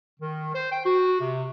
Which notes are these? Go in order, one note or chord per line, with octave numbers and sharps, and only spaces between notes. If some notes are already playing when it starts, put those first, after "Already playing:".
D#3
C5
G5
F#4
C3